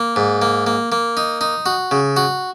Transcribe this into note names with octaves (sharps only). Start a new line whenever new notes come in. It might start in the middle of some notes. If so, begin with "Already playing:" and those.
Already playing: A#3
G#2
A#3
A#3
A#3
D#4
D#4
F#4
C#3
F#4